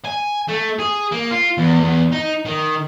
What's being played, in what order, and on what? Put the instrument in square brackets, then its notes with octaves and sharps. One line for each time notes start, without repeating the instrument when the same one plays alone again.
[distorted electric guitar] G#5
A3
G#4
A#3
F4
E2
E2
D#4
D#3